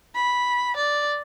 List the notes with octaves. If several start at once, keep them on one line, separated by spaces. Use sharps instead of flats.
B5
D5